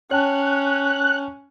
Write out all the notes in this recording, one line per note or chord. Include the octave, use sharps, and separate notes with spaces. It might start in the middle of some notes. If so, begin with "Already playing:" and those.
C#4 C#5 G5 A5 F#6